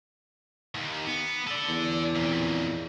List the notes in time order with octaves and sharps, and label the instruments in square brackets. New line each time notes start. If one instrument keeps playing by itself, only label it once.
[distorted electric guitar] D#2 D#3
B3
A4 D5
[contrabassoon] E2
[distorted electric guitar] F2 A#2